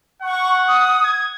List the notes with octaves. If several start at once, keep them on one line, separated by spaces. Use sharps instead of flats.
F#5 C#6
D#6
G#6